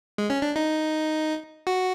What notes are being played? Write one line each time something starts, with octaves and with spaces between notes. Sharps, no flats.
G#3
C#4
D4
D#4
F#4